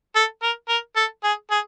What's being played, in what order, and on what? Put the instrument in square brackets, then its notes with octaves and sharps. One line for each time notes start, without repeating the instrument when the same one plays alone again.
[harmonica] A4
A#4
A#4
A4
G#4
G#4